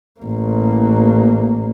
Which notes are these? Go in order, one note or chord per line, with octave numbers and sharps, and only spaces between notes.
A1 A#3